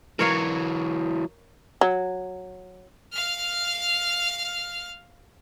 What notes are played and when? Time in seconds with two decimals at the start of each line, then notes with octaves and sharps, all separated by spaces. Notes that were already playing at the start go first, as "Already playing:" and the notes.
0.19 E3 F#3 A#4 C#5 F5
1.81 F#3
3.13 F5 F6